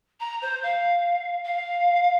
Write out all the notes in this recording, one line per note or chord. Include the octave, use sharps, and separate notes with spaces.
A#5
C5
F5
F5